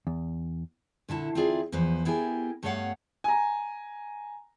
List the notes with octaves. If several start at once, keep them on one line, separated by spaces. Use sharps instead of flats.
E2
A#2 D3 E4 A5
C4 E4 F4 G#4 B4 D5
E2 F3 B3 B4 C5
B3 E4 G4 G#4 A#4 G#5
G2 A3 B3 C#5 F5 F#5
G#5 A#5